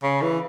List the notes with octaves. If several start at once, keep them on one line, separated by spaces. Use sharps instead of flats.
C#3
E3